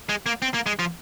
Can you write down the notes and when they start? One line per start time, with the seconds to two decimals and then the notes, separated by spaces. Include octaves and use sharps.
0.09 G#3
0.26 A#3
0.42 C4
0.54 A#3
0.66 G#3
0.79 F3